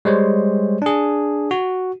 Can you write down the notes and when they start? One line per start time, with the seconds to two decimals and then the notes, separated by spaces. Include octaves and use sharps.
0.05 G3 G#3 C5 C#5
0.82 D4 G#4
1.51 F#4